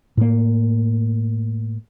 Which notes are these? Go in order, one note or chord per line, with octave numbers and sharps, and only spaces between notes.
A2 A#3